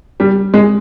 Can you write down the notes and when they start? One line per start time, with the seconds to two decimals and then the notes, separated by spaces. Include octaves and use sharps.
0.20 G3
0.54 G#3